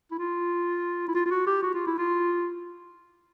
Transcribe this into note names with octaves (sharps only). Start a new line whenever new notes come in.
E4
F4
E4
F4
F4
F#4
G4
F#4
F4
E4
F4